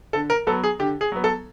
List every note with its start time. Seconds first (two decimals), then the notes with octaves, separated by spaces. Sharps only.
0.13 D3 A4
0.30 A#4
0.47 F#3 B3 A4
0.64 G#4
0.79 D3 G4
1.01 G#4
1.12 F#3 B3
1.24 A4